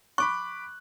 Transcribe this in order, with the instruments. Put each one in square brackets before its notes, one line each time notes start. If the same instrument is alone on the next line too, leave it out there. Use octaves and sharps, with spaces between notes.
[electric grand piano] B5 D6 F#6 [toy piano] C#6